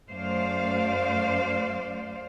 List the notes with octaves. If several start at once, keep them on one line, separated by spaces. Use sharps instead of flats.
F#2 A3 C5 D5 F5